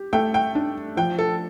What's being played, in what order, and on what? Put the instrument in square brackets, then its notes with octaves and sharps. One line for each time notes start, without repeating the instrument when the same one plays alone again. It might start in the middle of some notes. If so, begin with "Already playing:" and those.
Already playing: [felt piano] G4
[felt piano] A3 [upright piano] G5
[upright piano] G5
[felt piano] D4
[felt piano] F3 [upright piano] G5
[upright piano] A4